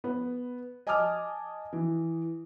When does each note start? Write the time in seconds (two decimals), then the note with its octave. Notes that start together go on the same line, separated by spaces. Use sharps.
0.04 B3
0.87 D#5 G#5 A5 D6 D#6 F6
1.73 E3